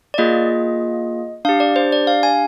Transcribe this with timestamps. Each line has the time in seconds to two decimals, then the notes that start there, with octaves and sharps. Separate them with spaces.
0.14 D5
0.18 A#3 F4 G#4 D#5
1.45 D4 G4 F5
1.60 D5
1.76 C5
1.92 D5
2.07 F5
2.23 G#5